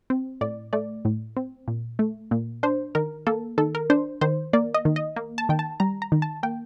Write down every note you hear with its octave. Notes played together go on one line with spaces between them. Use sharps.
C4
A2 D5
A3 D5
A2
C4
A#2
A3
A#2
D4 C5
D#3 A#4
A#3 A4
D#3 A4
A#4
D4 C5
D#3 C5
A#3 D5
D#5
D#3
D#5
A#3
A5
D#3 G5
A5
G3 A#5
A#5
D#3
A5
A#3 G5